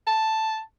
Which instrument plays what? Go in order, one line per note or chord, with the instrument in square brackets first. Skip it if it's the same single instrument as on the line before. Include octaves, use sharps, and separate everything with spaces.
[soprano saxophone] A5